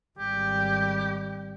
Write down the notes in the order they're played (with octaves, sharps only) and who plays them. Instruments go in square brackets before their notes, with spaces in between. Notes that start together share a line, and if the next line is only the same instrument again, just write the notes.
[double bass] G#1 G3 [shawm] G4